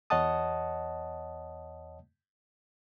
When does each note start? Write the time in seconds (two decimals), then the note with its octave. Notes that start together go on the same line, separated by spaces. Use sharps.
0.10 E2 C#5 D#5 F#5 A5 D#6